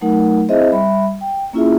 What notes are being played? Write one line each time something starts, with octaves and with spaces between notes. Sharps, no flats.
F#3 A3 D#4 A#4 F#5
C4 E4 G#4 C5 D#5 E5
G3 E5 B5
G5
A#3 C#4 E4 F4 G#4 E5